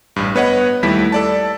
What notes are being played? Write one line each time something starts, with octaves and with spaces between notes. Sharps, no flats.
A1 G2
B3 B4 C#5 D#5 F#5
D#2 G3 A3 E4 B6
A4 D5 A5